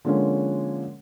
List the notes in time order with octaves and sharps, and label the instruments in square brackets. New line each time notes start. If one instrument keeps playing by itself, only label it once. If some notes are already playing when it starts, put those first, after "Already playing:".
[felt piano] D3 F3 G#3 A#3 C#4